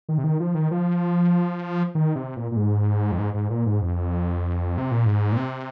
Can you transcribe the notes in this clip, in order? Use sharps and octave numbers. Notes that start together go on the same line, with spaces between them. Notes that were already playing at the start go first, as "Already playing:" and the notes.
D#3
C3
D#3
F3
D#3
F3
D#3
C3
A#2
A#2
G#2
F2
G#2
G#2
A#2
G#2
F2
C3
A#2
G#2
A#2
C3